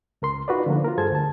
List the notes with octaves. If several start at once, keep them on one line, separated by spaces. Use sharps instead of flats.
C#2 A#4 C6
D#4 F4 F#4 B4 D5
D3 F3 A#3
F4 F#4 A#4
G2 G#4 A4 C5 A5 G#6
D2 A5